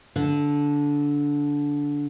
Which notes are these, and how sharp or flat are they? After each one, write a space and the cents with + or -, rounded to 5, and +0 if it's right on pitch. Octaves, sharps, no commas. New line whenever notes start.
D3 -15